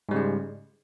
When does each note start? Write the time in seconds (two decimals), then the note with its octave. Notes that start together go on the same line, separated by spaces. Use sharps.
0.09 G#2
0.11 G3
0.14 C#3
0.16 G#3